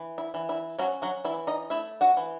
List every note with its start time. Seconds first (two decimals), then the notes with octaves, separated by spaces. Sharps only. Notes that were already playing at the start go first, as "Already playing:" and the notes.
Already playing: E3
0.18 E4
0.34 E3
0.49 E4
0.79 F#3 C#4 F#4
1.02 F#3 F#4
1.24 E3 E4
1.47 D#4 D#5
1.70 A3 E4 E5
2.01 F#4 F#5
2.17 E3